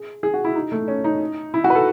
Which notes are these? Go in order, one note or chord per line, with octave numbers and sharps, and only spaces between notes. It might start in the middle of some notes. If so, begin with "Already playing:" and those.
Already playing: G#4
G#4
F#4
E4
D#4
A3
C#4
D#4
E4
F#4
B4
A4